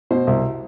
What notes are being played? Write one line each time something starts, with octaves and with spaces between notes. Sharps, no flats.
B2 C5
C2